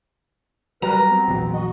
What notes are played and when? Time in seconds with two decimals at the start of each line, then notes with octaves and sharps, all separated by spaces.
0.82 F#3 G3 A#4 B4 A#5
1.11 B3 C4
1.28 A#1 E2 F#3
1.53 F#4 D#5